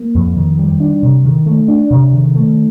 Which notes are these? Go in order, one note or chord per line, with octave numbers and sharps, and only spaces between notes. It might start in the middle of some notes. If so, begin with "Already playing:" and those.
Already playing: A#3
F2
D#3
G3
D4
C3
D#3
A3
D4
C3
D#3
A3